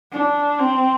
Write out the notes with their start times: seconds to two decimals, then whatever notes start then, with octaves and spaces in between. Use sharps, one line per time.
0.12 D4
0.59 C4